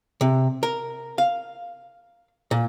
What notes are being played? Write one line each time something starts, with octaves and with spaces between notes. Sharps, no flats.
C3
A#4
F5
A#2